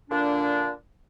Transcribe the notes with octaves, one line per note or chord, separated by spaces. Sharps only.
A#2 D3 D4